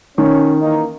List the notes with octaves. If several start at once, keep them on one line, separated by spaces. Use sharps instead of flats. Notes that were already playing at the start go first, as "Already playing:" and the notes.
D#3 C#4
E3 A#3 D#4